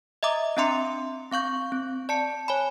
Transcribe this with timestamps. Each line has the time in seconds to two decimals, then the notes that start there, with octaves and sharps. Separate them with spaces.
0.23 D#5 E5 A#5 D6 D#6
0.57 C4 D4 E5 A#5 C6 C#7
1.31 C4 F5 C#6 G6
1.72 C4
2.09 D5 A5 C#7
2.48 C#5 G#5 B5